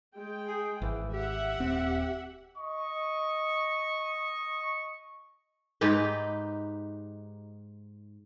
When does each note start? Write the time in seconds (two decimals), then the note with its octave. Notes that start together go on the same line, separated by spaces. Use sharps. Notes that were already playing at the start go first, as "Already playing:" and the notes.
0.17 G#3 G5
0.48 G#4
0.82 G#1 E3
1.14 G4 E5 F#5
1.60 D#1 C4
2.56 D#5 C#6
5.81 G#2 D#4 G4 B4